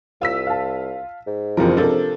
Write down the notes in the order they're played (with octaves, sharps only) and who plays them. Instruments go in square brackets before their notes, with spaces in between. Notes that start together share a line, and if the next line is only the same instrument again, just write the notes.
[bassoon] C2 [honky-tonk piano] F4 E6 B6
[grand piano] F5 A5
[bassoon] G#2
[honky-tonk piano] F#1 G3 A#4 [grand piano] E3 F3 C4
[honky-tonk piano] C3 F3 D4 [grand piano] A4 A#4